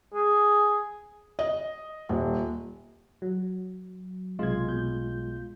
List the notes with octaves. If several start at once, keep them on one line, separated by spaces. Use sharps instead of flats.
G#4
D#5
D#1
F#3
B1 C3 G#3 F4 G#6
B2 G6